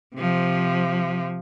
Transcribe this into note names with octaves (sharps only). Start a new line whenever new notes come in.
C3 F3